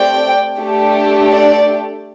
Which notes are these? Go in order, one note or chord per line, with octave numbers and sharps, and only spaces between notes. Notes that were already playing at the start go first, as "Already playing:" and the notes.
Already playing: A3 C4 G4 D5 G5
A3 D4 G4
D5